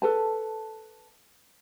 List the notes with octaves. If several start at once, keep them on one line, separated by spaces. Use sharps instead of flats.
A4 B4 A5